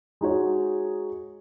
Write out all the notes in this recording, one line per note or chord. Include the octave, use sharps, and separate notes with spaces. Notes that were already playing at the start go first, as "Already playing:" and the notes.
G#3 D#4 F#4 C#5